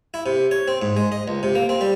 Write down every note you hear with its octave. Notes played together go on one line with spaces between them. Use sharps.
E4
C3
C#5
C4
G#2
G#3
D#5
C#2
C3
A#3
C4
G3